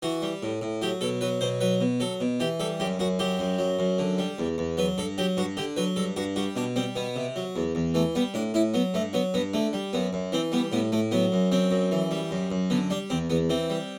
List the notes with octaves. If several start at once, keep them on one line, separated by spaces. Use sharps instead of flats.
E3 F#4
G3
A2
A2
F#3 G4
B2 A4
F#3 B4
B2 C5
F#3 B4
B2
F#3 A4
B2
E3 G4
G3 A4
F#2 G4
F#2 F#4
F#3 G4
F#2
F#3
F#2
D3
G3
E2
E2
F#3 B4
G2 A4
F#3 G4
G2 F#4
D3 G4
F#3 B4
G2 A4
G2 F#4
G3 F#4
B2 D4
G3 C4
B2 B3
C3
F#3
E2
E2
E3 A3
G3 B3
A2 D4
A2 E4
F#3 B3
G2 A3
F#3 B3
G2 B3
D3 A3
G3
F#2 B3
F#2
E3 C4
G3 B3
A2 B3
A2 A3
F#3 B3
F#2
F#3 C4
F#2
E3
G3
F#2
F#2
D3 B3
G3 D4
E2 C4
E2 B3
E3 C4
G3